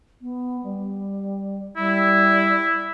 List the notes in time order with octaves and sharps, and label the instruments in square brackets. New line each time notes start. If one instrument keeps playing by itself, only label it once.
[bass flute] B3
G3
[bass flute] G3 [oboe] E4